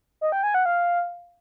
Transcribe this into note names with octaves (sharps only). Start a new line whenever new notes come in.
D#5
G5
G#5
F#5
F5